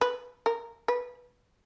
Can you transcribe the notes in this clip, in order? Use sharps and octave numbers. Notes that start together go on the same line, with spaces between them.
B4
A#4
B4